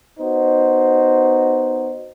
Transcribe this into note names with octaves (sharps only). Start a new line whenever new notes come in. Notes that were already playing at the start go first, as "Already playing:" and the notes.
B3 D#4 F#4 C5